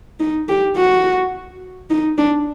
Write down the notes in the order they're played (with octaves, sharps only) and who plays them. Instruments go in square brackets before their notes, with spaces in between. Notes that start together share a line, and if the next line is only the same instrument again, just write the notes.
[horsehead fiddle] D#4
G4
F#4
D#4
D4